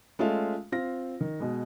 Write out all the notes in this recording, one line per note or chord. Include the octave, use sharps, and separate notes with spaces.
G#3 A3 C#4 F4 E5 F5
C4 F4 F5 A#6
D#3
B2 G#3